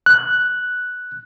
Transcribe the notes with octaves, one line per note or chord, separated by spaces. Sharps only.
F#6